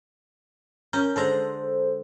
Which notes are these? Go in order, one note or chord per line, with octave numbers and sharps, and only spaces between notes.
C#4 A#4 G6
D3 G#3 A4 C5 A#5